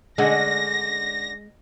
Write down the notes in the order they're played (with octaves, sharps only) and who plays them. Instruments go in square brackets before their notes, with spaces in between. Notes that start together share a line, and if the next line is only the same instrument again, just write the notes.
[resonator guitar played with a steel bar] D3 C#4 F#5 [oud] G#3 [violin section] A#6